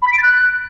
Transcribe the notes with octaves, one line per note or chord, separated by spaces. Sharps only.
B5
B6
D7
A6
F#6